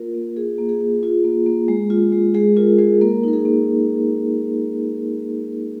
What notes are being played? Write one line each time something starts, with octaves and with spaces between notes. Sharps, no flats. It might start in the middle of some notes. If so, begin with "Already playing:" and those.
Already playing: A#3 F4 A#4
A#3
F4 G#4
A#3
G#4
A#3
F4
A#3
A#3
G#3
F4
G#3
G#3 G#4
F4 A#4
G#3 G#4
A#3 A#4
D#4 A#4
G#4
A#3